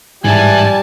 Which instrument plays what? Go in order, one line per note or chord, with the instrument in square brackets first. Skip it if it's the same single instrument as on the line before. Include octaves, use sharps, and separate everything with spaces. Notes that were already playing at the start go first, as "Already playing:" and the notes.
[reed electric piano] G#2 [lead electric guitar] E3 E4 [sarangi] G3 [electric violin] G#5 A5